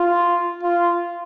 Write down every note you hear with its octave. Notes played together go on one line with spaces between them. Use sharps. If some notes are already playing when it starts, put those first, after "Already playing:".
Already playing: F4
F4